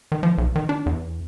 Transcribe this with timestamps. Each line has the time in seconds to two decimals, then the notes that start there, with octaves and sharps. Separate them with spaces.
0.12 D#3
0.23 F3
0.38 B1
0.55 D#3
0.69 D4
0.86 E2